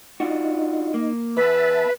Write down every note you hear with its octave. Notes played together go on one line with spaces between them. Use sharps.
D4 D#4 F4 F#4
A#3
E2 B4 E5 A5 B5